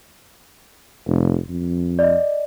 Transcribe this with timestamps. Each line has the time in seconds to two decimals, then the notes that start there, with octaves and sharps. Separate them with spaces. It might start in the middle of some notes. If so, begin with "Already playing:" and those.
1.07 F1
1.49 F2
1.99 D5 D#5